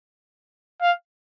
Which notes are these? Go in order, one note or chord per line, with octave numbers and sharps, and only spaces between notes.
F5